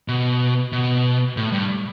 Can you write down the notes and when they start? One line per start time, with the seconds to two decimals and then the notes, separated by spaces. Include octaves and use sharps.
0.08 B2
0.72 B2
1.37 A2
1.52 G2